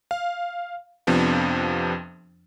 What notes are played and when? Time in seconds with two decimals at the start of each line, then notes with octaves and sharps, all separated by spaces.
0.11 F5
1.07 F2 C3 F3 B3 D4